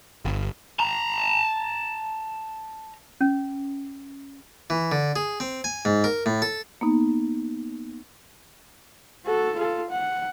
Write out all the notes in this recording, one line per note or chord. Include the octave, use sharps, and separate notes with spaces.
G1
A5 A#5
C#4
E3
D3
G#4
C4
G#5
G#2
A#4
A2
A4
A#3 B3 D#4
F#4 A4
F4 A4
F#5